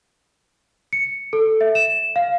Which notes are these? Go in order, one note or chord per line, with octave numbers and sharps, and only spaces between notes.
C#7
A4
E5
E7
F5